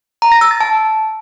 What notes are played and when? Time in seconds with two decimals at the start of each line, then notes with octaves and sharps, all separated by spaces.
0.22 A#5
0.32 A#6
0.41 E6
0.51 A6
0.61 A5